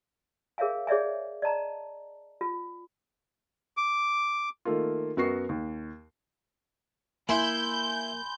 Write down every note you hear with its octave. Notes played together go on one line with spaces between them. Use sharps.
G#4 A#4 C#5 E5 F5 G#5
G#4 C#5 D5 E5 G#5
D5 D#5 A5 A#5
F4
D6
D#3 A3 A#3 F4
F#2 B3 F#4 A#4 C#6 C7
D#2
A#3 E4 G#5 B5 C6 G6